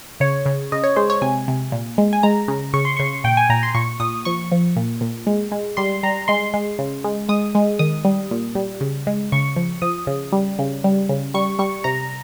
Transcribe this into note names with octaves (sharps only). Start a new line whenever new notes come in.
C#3 C#5
C#3
C#3 D#5
C#5
G#3 C5
C#5
C3 G#5
C3
A#2
G#3
G#5
G#3 A#5
C#3
C#3 C#6
C6
C#3 C#6
A#2 G5
G#5
A#2 A#5
C6
A#2 C#6
A#2 D#6
F3 C#6
F3
A#2
A#2
G#3
G#3
G3 C6
G3 A#5
G#3 C6
G#3
C#3
G#3
G#3 D#6
G#3
D#3 D#6
G3
A#2
G3
C#3
G#3
C#3 C#6
F3
F3 D#6
C#3
G3
C#3
G3
C#3
G3 C#6
G3 C#6
C3 A#5